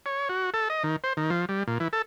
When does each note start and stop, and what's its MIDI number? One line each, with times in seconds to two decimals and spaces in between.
0.06 0.29 73
0.29 0.50 66
0.54 0.68 69
0.70 0.83 75
0.84 0.96 51
1.04 1.13 72
1.17 1.30 51
1.30 1.45 53
1.49 1.63 55
1.68 1.78 46
1.80 1.88 52
1.93 2.02 69